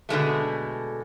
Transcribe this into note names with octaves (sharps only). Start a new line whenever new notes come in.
B2 D3 G#3 A3